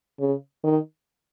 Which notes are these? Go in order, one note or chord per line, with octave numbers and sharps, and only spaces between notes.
C#3
D#3